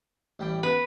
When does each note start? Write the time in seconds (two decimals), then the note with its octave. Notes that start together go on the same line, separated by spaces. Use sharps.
0.39 A1 G3 G5
0.63 B3 B4